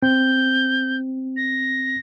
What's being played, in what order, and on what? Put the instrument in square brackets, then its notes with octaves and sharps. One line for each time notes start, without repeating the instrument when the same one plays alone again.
[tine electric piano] C4 [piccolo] G6
[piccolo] A#6